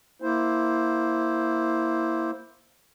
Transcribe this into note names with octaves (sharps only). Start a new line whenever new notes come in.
A#3 E4 C5